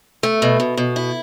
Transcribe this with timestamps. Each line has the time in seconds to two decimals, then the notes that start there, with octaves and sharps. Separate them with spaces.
0.23 A3
0.42 B2
0.60 B2
0.77 B2
0.96 E4